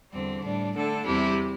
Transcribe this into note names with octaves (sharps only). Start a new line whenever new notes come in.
E2 D3 G3 C4
A2 G3 D4
D3 A3 D4 A4
E2 C3 G3 E4 G4